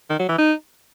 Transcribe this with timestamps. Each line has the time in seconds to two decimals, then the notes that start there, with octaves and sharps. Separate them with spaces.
0.10 D#3
0.19 F#3
0.29 E3
0.38 D#4